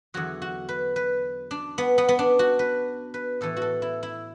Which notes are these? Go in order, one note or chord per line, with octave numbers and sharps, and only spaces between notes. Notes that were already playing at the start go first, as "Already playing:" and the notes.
E2 D3 F#3 F#4
F#4
B4
B4
D4
B3
B3
B3
D4
F#4
B4
B4
A2 E3 A4
F#4
A4
E4
E4